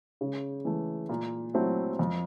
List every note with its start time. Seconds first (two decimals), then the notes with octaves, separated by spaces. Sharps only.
0.21 C#3
0.65 E3 A3
1.09 A#2
1.54 F#3 A3 C4 E4
1.99 F2